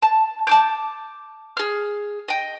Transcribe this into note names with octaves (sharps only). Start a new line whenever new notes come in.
A5
A5 D6 G6
G#4 F6
D#5 G5